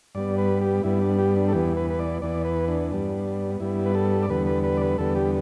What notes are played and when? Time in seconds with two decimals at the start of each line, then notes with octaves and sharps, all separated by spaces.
0.15 G2 G3 B3 D5
0.38 B4
0.61 G4
0.84 G2 G3 B3 E4
1.01 D4
1.19 G4
1.36 D4
1.48 A4
1.53 E2 E3 B3 G4
1.77 B4
1.90 B4
1.99 D5
2.22 E2 E3 B3 D5
2.45 B4
2.68 D4
2.91 G2 G3 B3
3.60 G2 G3 B3 E4
3.86 B4
3.95 A4
4.23 D5
4.30 E2 D3 G3 B3 B4
4.47 B4
4.64 B4
4.77 D5
4.81 B4
4.98 E2 D3 G3 B3 A4
5.16 G4